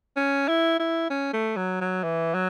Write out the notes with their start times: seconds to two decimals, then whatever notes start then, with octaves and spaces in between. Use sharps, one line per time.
0.17 C#4
0.48 E4
0.80 E4
1.10 C#4
1.33 A3
1.56 F#3
1.81 F#3
2.03 E3
2.34 F#3